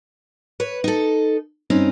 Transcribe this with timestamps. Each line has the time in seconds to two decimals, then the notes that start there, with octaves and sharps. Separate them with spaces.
0.60 B4 C#5
0.84 D#4 A4
1.70 G2 C4 C#4 D#4